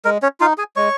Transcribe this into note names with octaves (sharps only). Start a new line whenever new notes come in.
G#3 A#4
C#4 C#5
D#4 F4 F5
G#4 G#5
G#3 C#5 C#6